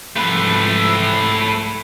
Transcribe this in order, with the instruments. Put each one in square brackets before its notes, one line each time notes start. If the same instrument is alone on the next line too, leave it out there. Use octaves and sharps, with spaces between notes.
[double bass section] C2 G#2 F3 [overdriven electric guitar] A3 B4